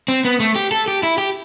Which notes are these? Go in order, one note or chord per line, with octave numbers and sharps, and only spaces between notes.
C4
B3
A3
G4
A4
G4
E4
G4